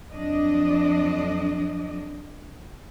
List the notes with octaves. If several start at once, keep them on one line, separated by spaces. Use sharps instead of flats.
F2 F#3 D4 D5 D#5